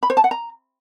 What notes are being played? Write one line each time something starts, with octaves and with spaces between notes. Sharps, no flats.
B5
C5
A5
F#5
A#5